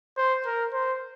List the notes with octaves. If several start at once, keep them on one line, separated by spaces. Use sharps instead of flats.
C5
A#4
C5